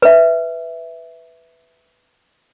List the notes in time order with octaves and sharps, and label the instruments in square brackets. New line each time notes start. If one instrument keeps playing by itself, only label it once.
[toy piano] B4 E5